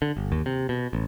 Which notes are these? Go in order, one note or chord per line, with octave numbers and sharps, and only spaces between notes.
D3
G1
D#2
C3
B2
A1